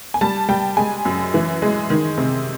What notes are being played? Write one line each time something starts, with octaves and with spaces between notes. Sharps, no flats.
G#5
G3 A5
G3 G5
G#3 G#5
F#2
E3
G#3
D#3
C3